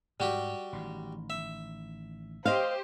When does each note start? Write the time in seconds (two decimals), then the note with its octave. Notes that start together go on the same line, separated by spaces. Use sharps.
0.20 G#2 G3 F#4 G4
0.73 A1 D#3
1.30 E5
2.45 G4 C5 D#5 F5